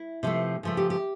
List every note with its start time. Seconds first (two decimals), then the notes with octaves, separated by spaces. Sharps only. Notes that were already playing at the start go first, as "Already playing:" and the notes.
Already playing: E4
0.23 C3 F3 A3
0.63 C#3 F3 A3
0.77 G4
0.90 G4